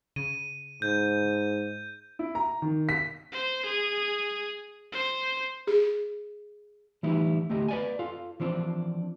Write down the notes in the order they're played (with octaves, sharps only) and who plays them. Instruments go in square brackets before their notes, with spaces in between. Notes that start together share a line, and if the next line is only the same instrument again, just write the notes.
[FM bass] C#3 [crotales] D#7
[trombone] G#2 [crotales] G6
[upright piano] E4
A#5
D#3
B6
[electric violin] C5
G#4
C5
[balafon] G#4
[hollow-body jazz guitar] E3 G3 A3 D#4 E4
D2 A3 G4 D#5 A#5
B4 D5 G#5
F4 A4 F5
E3 F3 C4 D4